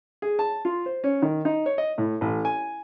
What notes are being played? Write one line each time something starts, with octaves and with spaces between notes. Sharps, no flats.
G#4
A5
F4
C5
C#4
D#3
D#4
C#5
D#5
A2
A1
G#5